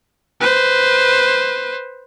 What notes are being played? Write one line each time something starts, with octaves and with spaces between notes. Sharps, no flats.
B4 C5